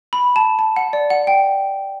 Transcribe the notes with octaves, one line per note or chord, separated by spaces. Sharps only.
B5
A5
A5
F#5
D5
F#5
G5